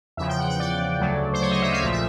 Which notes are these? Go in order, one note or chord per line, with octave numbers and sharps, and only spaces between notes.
E2 C#3 F3 E5
G5
F#5
G5
D5
D2 C#3 F#3 A3
C5
C#5
D#5
E5
F5
A#1 A#2 F3 A3 E5
E5